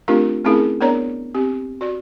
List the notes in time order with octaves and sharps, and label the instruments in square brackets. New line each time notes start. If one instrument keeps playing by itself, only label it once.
[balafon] A3 C4 D4 F4 G4 A#4
A3 C4 C#4 E4 G#4 A#4
B3 D4 A#4 C#5 D5 A#5
C4 G4
F#4 D5